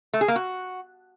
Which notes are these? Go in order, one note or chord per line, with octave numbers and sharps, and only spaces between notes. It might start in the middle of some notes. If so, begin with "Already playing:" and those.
A3
G#4
A#3
F#4